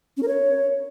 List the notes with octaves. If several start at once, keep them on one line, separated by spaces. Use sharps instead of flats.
C#4
A#4
C#5